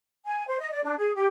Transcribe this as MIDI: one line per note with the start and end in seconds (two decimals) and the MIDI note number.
0.26 0.44 80
0.48 0.57 72
0.60 0.71 75
0.72 0.82 74
0.84 0.95 62
0.98 1.13 68
1.15 1.27 67